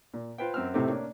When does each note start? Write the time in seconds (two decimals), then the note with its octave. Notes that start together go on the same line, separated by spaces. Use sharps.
0.14 A#2
0.38 F4 B4 C5 G5
0.54 F#2 C4 E6 F6
0.74 A2 C3 A3 C4 D#4 G4
0.87 A#3 C#4 D4